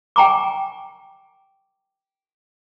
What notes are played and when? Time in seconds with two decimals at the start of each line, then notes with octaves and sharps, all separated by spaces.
0.16 G5 G#5 A#5 C#6 D6